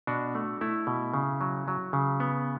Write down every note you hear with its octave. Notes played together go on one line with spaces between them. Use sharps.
B2 D4 F#4
A3
A3 E4
B2
C#3
F#3
F#3
C#3
B3